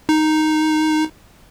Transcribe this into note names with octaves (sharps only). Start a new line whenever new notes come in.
D#4